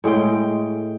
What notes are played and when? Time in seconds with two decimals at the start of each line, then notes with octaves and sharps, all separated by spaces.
0.04 A2 G#3 G#4 G5